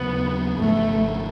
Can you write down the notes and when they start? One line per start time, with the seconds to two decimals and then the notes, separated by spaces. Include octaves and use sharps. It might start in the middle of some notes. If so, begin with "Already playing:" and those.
Already playing: D#2 C#3 F#3 A#3 B3
0.58 G#1 F#2 C#3 F3 A3